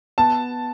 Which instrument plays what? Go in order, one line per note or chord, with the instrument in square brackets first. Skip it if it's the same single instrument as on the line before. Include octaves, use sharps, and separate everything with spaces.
[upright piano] B3 A5